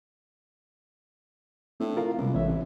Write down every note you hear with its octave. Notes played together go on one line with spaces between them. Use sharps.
A2 C4 D4
F4 A#4 F5
C#2 C3 G3 B3
A1 C#5 E5
C2